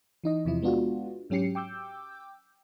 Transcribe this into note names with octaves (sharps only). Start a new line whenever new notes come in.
E3 D#4 D#5
E2 C3 F3 E4
G#3 B3 D4 F4 F#4
G#2 F#3 C#4 G4 C7 C#7
G5 D6 E6 G6